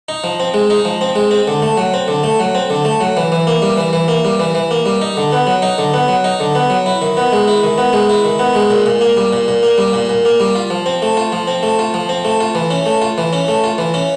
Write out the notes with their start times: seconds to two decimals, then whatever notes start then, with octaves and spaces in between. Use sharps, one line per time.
0.09 D#4
0.24 F3
0.40 C4
0.54 G#3
0.70 D#4
0.85 F3
1.01 C4
1.16 G#3
1.31 C4
1.48 D3
1.62 A3
1.77 F#3
1.94 C4
2.08 D3
2.23 A3
2.40 F#3
2.55 C4
2.70 D3
2.85 A3
3.01 F#3
3.17 E3
3.32 E3
3.47 A#3
3.62 G3
3.77 E3
3.93 E3
4.08 A#3
4.25 G3
4.40 E3
4.55 E3
4.71 A#3
4.86 G3
5.01 D#4
5.17 D3
5.32 B3
5.47 F#3
5.62 D#4
5.78 D3
5.94 B3
6.08 F#3
6.24 D#4
6.40 D3
6.55 B3
6.70 F#3
6.86 E4
7.02 D#3
7.17 B3
7.32 G#3
7.48 E4
7.63 D#3
7.78 B3
7.93 G#3
8.09 E4
8.25 D#3
8.39 B3
8.55 G#3
8.70 A#2
8.86 A#2
9.01 A#3
9.17 G3
9.33 A#2
9.48 A#2
9.63 A#3
9.78 G3
9.93 A#2
10.09 A#2
10.25 A#3
10.40 G3
10.55 F4
10.70 F3
10.86 C4
11.02 A3
11.17 F4
11.32 F3
11.47 C4
11.63 A3
11.79 F4
11.94 F3
12.09 C4
12.25 A3
12.40 F4
12.55 E3
12.71 C#4
12.86 A3
13.02 F4
13.18 E3
13.33 C#4
13.48 A3
13.64 F4
13.78 E3
13.94 C#4